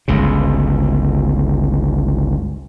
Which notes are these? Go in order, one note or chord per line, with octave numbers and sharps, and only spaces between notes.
G1 C#2 C#3